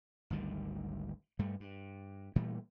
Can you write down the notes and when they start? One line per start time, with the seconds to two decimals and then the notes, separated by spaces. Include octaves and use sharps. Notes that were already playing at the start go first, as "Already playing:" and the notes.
0.30 G#1 D2 D#3 G3
1.39 G2 G3 A3
1.60 G2
2.36 A#2 E3 G3 A3